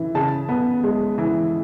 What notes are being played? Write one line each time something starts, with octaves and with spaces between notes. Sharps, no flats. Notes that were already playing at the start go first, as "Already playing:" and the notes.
Already playing: E3
C#3 A5
B3
G#3
E3